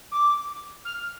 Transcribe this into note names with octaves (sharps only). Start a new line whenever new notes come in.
D6
F6